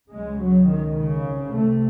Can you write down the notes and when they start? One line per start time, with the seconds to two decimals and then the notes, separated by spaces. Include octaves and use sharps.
0.12 C#2 C#3 G#3
0.40 F#3
0.69 D#3
0.97 C#3
1.26 C2 C3
1.54 A3